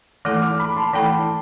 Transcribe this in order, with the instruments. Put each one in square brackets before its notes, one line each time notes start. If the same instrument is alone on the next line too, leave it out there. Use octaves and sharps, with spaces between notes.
[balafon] E3 A3 E4 A4 [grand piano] D6 F6
[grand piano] D6 F6
B5 D6
A5 C6
[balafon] E3 A3 E4 A4 [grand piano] G5 B5